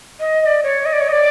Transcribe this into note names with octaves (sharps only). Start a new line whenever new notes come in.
D#5
D#5
D5
C#5
D#5
D5
C#5
D#5
D5